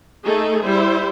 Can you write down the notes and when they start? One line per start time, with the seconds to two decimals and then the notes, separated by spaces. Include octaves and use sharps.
0.25 A3 D#4 G#4 A4
0.64 G3 E4 C5